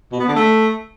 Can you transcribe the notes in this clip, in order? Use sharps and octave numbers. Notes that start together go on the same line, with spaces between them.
B2
B3
D3
A3